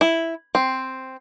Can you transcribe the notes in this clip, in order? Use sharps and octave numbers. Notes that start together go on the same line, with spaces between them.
E4
C4